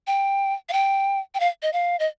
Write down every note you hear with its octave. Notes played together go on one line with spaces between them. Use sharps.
G5
F5
G5
G5
F5
D#5
F5
D#5